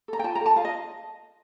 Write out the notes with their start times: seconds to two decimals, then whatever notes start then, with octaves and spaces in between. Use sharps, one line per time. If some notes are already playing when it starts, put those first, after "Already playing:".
0.08 A4 A#5
0.19 G5
0.24 F4 A5
0.35 A#5
0.41 A4 A5
0.56 F4 F5
0.65 D#5